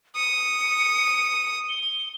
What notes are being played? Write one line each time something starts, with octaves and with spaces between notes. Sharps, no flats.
D#6 C#7
G7